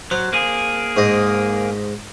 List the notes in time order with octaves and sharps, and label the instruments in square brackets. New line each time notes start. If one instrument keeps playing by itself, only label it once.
[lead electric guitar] F#3 [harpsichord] C5
[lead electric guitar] A#3 G#4
[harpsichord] G#2 C5 D#5